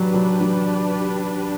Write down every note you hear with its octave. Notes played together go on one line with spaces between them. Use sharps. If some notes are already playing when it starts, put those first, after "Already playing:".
Already playing: F#3 D4 G4 B4
F#3
F#3